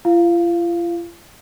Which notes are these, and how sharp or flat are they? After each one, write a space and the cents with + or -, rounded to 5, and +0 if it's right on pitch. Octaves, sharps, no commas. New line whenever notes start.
F4 -40 F5 -5